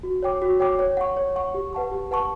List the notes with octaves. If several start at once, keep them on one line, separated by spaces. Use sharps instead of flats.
F#4
C#5 G5 D6
F#4
C#5 G5 D6
C#5
F#5 C#6
C#5
F#5 C#6
G4
B4 F#5 A5 C#6
G4
B4 F#5 A5 C#6